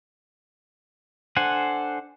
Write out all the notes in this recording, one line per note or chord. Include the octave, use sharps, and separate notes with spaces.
D4 A4 C5 F#5 G#5